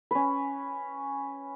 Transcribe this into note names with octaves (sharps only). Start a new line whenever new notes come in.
C#4 B4